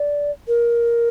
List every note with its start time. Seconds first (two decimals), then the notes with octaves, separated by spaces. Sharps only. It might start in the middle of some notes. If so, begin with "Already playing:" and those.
Already playing: D5
0.48 A#4